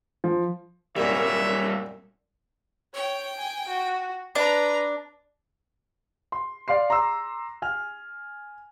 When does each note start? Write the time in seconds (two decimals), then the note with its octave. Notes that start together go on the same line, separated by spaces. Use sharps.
0.24 F3
0.97 C2 F#2 A#2 G3 A#3 C#5 E5
2.94 C#5 G5
3.37 G#5
3.68 F#4
4.35 D4 B4 A#5
6.32 C6
6.68 D5 F5 C6 C7
6.90 A#5 C6 D6 E6
7.62 G#5 F6